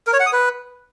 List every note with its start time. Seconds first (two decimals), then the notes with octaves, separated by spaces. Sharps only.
0.07 A#4
0.13 C#5
0.20 F#5
0.26 D#6
0.33 B4